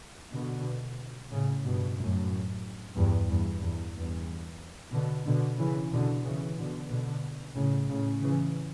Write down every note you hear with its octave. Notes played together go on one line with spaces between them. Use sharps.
B2 D3
A2 C#3
G2 B2
F#2 A2
E2 G2
E2 G2
E2 G2
E2 G2
B2 D3
B2 D3
C#3 E3
B2 D3
C#3 E3
B2 D3
B2 D3
A2 C#3
A2 C#3
C#3 E3